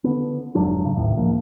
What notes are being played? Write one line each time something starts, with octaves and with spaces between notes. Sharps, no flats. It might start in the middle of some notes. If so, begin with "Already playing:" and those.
D3 B3
F1 G#2 F#3 D4
C#3
A1 D#2 A2
D#1 C#2 F3 A#3